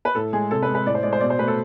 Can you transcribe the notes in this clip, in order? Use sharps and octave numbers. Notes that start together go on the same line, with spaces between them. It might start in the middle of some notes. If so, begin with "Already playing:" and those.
B4
A2 A4
G#3 G#4
C3 A4
B4
G#3
B4
A2 D5
C5
G#3 D5
C5
B2 D5
C5
A3 B4
A4